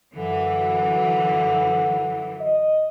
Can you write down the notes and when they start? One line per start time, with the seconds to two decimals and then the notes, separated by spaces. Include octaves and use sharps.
0.15 F#2 D3 E3
2.41 D#5